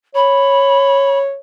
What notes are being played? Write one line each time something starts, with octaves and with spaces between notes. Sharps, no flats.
C#5 B5